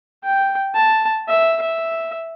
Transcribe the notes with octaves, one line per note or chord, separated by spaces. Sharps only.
G5
A5
E5
E5